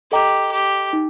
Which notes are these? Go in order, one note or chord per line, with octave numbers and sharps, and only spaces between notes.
G4 A4 D#5 G5 A#5 D6
G4
D#4